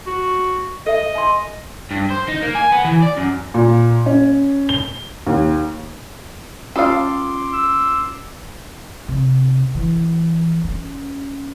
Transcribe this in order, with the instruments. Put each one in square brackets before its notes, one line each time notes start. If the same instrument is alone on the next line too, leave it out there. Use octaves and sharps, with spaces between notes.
[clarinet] F#4
[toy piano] A4 E5 [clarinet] D#5
[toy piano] G#5 C6
[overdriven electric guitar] G2
C5
D#4
A#3
G#5
B3
E3
D5
F#2
[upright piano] A#2
C#4
G7
D#2
[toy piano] C#4 F4 D#6 [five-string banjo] A4 F5 [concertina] C6 D6
[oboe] E6
[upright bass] C3
E3
C#4